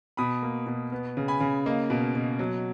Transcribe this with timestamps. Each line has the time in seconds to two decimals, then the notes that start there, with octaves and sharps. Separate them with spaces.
0.17 B2 B5 D#6
0.42 A#3
0.67 B2
0.92 B3
1.17 C#3
1.28 G#5 B5
1.40 C#3
1.66 A#3 D#5
1.90 B2
2.15 B2
2.39 F#3